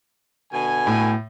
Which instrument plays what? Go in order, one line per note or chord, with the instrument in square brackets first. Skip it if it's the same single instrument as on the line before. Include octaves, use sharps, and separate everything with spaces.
[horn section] B2 D3 G#5
[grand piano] A2